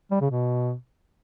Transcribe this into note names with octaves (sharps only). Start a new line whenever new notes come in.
G3
C#3
B2